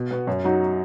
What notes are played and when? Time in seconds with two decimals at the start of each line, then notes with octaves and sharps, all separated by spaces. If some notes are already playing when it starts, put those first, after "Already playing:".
Already playing: B2
0.11 B3 F#4
0.27 F#2
0.44 F#3 D#4 F#4